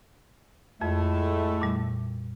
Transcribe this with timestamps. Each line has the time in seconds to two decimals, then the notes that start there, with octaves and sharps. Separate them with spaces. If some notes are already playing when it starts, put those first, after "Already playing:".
0.81 F2 A2 G#3 A3
1.62 A#2 G3